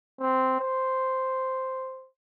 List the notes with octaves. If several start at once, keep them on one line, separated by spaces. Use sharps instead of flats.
C4
C5